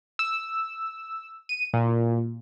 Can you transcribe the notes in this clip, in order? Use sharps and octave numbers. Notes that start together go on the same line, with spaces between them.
E6
D#7
A#2